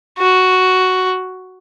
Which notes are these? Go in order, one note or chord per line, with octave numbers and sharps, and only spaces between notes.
F#4